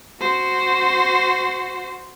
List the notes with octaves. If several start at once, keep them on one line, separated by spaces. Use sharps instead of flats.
F#4 C5